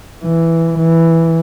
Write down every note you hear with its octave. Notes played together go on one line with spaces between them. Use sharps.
E3
E3